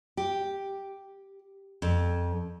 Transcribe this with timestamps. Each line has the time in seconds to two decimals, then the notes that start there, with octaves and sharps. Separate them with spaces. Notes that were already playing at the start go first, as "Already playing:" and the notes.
0.17 G4
1.82 F2